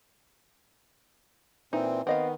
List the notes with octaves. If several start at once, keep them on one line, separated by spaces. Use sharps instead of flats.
A#2 E3 C4 D#4
D#3 B3 C4 D#5 F5